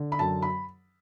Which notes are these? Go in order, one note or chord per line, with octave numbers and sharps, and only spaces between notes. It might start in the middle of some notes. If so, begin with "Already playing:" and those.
Already playing: D3
B5
F#2 A5
B5